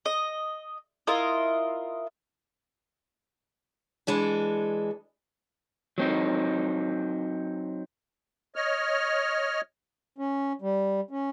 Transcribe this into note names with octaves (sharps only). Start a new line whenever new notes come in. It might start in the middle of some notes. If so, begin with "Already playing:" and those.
D#5
E4 F4 A#4 D#5
E3 G#3 D4 A4
F#3 C4 D#4
C#5 D#5 F6
C#4
G3
C#4